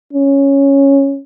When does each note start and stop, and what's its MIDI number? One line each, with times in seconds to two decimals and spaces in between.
0.13 1.21 61